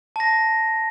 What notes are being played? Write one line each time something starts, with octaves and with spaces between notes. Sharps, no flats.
A5 A#6